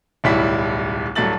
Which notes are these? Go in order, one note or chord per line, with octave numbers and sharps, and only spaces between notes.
D1 B1 G3 E4 B6
D1 G2 F#3 A3 A6 F#7